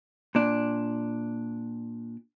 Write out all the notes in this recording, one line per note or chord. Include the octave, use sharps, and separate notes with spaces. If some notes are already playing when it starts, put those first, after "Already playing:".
A#2 D4